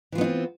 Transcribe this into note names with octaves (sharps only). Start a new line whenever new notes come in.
E3 B3 C4 D#4 F4